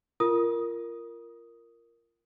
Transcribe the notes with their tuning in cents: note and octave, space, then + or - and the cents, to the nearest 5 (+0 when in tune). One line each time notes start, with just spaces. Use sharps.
F4 -20 A#4 -5 D#6 +0